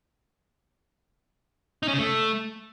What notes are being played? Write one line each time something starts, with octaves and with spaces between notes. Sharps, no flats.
D#4
C#4
C#3
A3